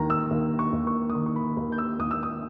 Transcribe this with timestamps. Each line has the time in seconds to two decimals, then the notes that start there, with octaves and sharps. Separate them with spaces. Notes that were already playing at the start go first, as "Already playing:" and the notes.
Already playing: D#2 D#3 A#5
0.10 E6
0.31 D#2
0.59 C#6
0.73 D#2
0.87 C#6
1.10 D#6
1.15 D#3 C#6
1.26 C#6
1.36 B5
1.57 D#2 B5
1.72 G6
1.78 E6
1.99 D#2 D#6
2.11 E6
2.23 D#6